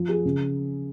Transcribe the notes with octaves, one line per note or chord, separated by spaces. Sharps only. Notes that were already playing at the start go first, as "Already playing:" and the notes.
Already playing: F3
G#4
C#3